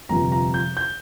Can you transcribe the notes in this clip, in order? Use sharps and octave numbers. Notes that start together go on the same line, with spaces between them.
G1 F2 C3 F3 A#5
A#5
G6
G6